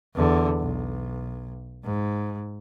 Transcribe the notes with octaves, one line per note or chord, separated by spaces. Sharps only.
E2 D3
B1
G#2